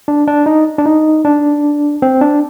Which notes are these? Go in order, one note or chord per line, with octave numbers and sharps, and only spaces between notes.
D4
D4
D#4
D4
D#4
D4
C4
D4